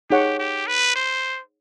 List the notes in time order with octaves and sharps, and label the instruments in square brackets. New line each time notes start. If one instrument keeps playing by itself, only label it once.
[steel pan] D#4 G#4 C#5 F#5 [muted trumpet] G4
[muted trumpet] G4
B4
C5